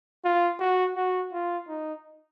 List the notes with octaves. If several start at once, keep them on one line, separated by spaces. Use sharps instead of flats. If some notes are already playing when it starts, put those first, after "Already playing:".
F4
F#4
F#4
F4
D#4